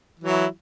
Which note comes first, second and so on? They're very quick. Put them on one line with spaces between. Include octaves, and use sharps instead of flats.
E3 F#3 E4